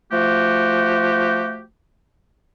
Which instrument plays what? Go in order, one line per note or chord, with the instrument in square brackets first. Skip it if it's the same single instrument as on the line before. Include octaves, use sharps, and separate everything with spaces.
[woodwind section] F3 A3 F#4 G4